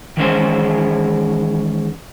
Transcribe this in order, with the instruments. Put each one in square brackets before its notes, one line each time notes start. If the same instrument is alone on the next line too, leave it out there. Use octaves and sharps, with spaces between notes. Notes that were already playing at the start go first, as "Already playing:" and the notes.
[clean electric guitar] D#3 E3 G#3 C#4 G#4 C5